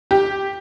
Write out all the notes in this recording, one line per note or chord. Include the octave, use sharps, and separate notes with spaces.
G4